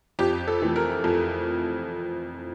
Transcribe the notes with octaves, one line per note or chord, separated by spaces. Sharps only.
F2 G4
A4
E3 A3
A#4
F2